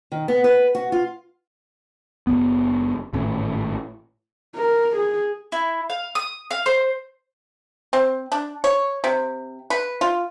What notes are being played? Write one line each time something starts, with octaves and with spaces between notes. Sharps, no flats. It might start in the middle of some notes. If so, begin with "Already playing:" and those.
D#3
B3
B4
F#4
F4
F#1 E2 B3
G#1 A2 C#4
A#4
G#4
E4
F5
D#6
F5
C5
C4
D4
C#5
C3
B4
F4